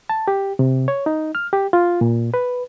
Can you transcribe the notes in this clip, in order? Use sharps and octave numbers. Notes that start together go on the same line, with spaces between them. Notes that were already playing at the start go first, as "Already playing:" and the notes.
A5
G4
C3
C#5
D#4
F6
G4
F4
A#2
B4